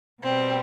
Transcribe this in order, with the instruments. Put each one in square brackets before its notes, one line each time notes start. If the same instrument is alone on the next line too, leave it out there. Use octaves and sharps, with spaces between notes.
[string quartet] B2 G3 C4